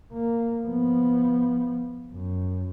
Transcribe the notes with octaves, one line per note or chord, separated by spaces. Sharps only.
A#3
F3 B3
F#2